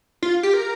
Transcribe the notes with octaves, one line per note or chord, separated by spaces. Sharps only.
F4
G4
A#4